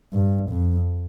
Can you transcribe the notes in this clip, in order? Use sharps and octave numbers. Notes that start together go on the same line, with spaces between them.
G2
F2